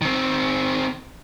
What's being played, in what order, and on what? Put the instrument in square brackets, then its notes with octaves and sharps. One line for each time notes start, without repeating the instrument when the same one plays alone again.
[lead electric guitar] D#3 C4